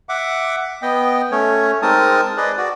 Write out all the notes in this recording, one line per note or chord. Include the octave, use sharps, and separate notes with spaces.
E5 F#5 D6
B3 D#5 G5
A3 C#4 C#5
G#3 C4 D#4 A#4 A5 D#6
G#4 B4 D5 D#5
F#4 D5